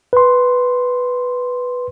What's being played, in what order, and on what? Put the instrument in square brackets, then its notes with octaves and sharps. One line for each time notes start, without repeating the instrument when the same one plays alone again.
[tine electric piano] B4 C6